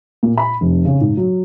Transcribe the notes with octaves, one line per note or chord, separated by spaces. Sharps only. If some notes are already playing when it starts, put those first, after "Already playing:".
A#2
B5
F1
C#3
G#2
F#3